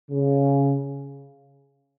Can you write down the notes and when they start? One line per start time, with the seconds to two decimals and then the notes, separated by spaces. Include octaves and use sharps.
0.11 C#3